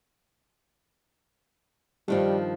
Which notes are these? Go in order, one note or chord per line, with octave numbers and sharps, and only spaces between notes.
G2 D#3 F3 G3